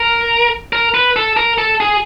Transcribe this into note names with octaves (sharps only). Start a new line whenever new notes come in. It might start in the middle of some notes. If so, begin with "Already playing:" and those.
Already playing: A#4
A#4
B4
A4
A#4
A4
G#4